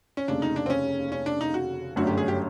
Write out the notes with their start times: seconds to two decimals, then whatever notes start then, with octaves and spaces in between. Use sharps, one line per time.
0.17 C#4
0.28 F1 D#2 C#3 D4
0.42 D#4
0.56 D4
0.66 C4
0.70 C#4
1.12 C#4
1.26 D4
1.41 D#4
1.54 F#4
1.96 G1 F#2 D3 F#3 A3 F#4
2.07 G4
2.17 G#4
2.28 G4